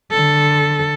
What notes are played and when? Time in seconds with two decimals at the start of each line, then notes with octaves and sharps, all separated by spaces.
0.12 D3 A4